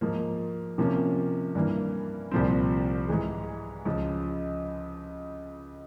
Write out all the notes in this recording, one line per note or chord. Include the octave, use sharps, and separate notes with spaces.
G#2 F3 A#3
C3 F3 A#3 C#4
G2 E3 A#3
C2 A#2 F3 C4
G#2 E3 G#3
C#2 C#3 F3